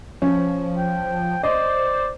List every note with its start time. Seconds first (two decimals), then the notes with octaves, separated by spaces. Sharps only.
0.22 F3 C#4
0.77 G5
1.43 C5 D5 D#5